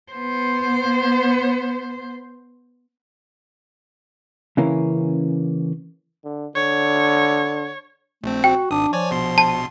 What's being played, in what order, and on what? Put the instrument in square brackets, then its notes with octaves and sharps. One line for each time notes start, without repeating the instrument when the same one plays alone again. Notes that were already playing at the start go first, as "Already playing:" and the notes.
[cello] B3 C5
[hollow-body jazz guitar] C#3 E3 A#3 C#4
[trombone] D3
[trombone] D3 [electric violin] C#5
[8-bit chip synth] A#1 C4 [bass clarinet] A3
[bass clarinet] F#4 [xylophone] G5
[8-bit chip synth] G#1 D#6 [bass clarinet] D4
[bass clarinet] F3 [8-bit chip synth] C#5 D5 G#5
[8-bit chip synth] A#1 B2 C6
[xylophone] A5